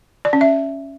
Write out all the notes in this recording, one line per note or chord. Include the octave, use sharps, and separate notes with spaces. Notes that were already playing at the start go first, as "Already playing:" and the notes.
D5
C#4
E5